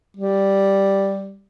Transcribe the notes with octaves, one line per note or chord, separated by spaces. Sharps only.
G3